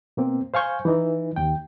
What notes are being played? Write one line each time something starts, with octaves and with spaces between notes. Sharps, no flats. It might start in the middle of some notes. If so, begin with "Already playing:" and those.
B2 A#3 C4
C5 F5 G#5 C#6 G6
E3 D#4
D#2 G5